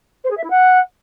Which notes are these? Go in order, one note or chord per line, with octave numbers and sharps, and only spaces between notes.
C5
G#4
E5
E4
F#5